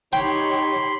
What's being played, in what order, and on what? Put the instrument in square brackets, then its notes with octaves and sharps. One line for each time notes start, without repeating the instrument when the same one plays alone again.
[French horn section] D#4 [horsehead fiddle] G4 C#5 [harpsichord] G5 [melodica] B5 C6